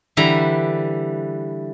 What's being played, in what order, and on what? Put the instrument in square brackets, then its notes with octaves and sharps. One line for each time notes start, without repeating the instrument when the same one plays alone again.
[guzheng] D3 E3 G3 E4 A#5